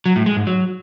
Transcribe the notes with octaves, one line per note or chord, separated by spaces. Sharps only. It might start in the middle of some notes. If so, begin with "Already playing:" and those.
F#3
A2
G#3
G#2
F#3